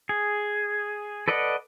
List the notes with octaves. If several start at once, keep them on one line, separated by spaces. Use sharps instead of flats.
G#4
A4 B4 D5 D#5 F#5